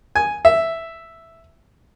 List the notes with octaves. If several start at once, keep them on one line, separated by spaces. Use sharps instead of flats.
G#5
E5